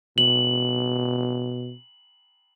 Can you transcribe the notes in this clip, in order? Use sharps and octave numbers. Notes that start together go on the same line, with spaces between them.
B2 F#7